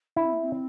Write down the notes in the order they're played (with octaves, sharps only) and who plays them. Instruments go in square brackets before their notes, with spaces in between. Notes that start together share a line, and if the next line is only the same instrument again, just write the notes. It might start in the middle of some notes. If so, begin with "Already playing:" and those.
[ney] D4 [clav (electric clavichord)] E4
[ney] C4
A#3
C4